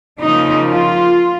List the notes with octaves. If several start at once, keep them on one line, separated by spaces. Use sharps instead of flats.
C#3 F3 A#3 D#4
F4